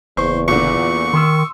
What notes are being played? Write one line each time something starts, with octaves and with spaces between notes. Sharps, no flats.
F#1 E2 C5 C#6
A#2 D3 C#6
D#3 C6 D#6 E6